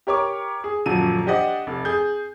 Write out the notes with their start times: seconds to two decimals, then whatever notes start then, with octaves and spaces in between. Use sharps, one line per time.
0.07 G4 A#4 C#5 C#6 D6
0.64 G#4
0.86 D#1 F#2 F3 F#3 D#7
1.26 D4 G4 C5 D5 D#5 F#5
1.67 F1
1.85 G#4 G6